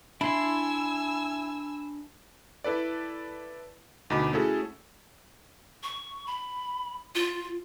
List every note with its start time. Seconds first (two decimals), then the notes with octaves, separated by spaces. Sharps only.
0.21 D4 E4 G#5 B5 C6 E6
2.64 E4 A4 B4 D5
4.10 D2 B2 D#4 B5 D6
4.33 A3 C#4 E4 F#4 G#4 A4
5.83 C#6
6.27 B5
7.15 F4